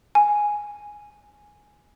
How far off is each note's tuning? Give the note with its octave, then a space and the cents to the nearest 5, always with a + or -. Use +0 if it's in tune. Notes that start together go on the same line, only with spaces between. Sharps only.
G#5 +0